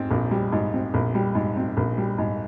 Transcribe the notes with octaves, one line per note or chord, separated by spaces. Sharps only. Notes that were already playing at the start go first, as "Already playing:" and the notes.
Already playing: G#2 C4
A#1
G3
G#2
C4
A#1
G3
G#2
C4
A#1
G3
G#2